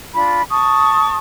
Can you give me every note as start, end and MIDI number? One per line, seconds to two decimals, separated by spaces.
0.15 0.42 62
0.15 0.42 65
0.15 0.42 83
0.50 1.17 81
0.50 1.17 85
0.50 1.17 87